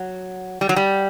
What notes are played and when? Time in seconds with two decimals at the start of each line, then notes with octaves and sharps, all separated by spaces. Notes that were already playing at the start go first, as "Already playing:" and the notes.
Already playing: F#3
0.61 G3
0.69 F#3
0.76 G3